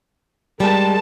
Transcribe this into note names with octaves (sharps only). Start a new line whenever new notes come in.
G3 G#3 A#4 A5